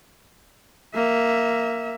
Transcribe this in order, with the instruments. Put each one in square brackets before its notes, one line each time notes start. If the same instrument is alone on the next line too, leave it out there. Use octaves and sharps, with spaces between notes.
[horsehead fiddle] A#3 E5